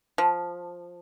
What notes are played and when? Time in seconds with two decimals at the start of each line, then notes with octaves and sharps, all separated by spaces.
0.18 F3